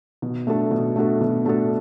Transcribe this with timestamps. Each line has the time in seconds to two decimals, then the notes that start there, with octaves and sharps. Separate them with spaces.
0.22 B2
0.47 A3 D4 F#4 A4
0.71 B2
0.96 A3 D4 F#4 A4
1.21 B2
1.45 A3 D4 F#4 A4